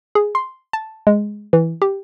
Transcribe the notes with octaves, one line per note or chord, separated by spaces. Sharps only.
G#4
C6
A5
G#3
E3
G4